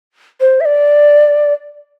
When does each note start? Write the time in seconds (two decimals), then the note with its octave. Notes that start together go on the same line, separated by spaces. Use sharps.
0.40 C5
0.61 E5
0.65 D5